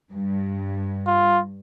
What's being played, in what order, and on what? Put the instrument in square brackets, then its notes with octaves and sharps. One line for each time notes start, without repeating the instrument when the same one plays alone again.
[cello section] G2
[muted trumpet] F4